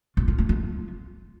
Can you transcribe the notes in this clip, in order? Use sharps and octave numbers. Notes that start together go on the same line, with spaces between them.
F4
F4
A3
F4